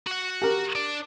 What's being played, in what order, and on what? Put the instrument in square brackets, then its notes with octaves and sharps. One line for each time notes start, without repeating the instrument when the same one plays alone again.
[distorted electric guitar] F#4 F#5
[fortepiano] G4 A#4
[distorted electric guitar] D4 D5